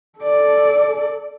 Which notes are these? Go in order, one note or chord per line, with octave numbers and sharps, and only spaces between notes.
A4 D5